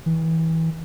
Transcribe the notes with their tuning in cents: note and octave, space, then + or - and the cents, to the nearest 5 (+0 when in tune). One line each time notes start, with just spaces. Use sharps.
E3 -25